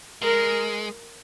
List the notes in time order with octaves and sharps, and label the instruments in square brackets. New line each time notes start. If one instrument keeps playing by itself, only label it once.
[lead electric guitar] G#3 [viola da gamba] A#4